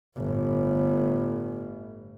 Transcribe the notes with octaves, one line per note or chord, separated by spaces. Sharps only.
G1 A2